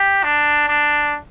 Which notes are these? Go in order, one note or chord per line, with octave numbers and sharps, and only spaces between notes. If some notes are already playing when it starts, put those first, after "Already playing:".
Already playing: G4
D4
D4